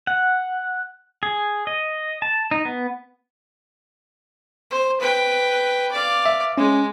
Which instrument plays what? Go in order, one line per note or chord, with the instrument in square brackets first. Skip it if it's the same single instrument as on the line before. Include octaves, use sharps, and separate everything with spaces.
[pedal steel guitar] F#5
G#4
D#5
A5
D#4
B3
[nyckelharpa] C5
B4 G5
D5 F5
[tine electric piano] E5
[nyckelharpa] G#3 [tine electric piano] C#4